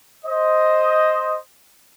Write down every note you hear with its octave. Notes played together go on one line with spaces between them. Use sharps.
C5 D#5